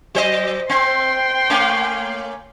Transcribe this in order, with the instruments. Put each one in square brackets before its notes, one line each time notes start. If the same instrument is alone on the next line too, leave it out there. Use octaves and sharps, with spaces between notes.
[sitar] F#3 C5 D#5
[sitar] C4 [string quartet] G5 C6
[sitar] A3 A#3 C#4